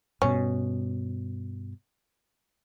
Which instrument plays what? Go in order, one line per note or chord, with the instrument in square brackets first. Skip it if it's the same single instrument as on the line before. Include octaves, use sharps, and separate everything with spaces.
[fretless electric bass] G2 B2 [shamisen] C#4